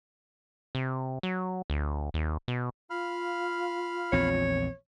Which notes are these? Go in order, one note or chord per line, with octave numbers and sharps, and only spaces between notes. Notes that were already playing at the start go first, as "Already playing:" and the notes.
C3
F#3
D2
D#2
B2
F4 F5 B5 F6
A#1 E2 C4 C#5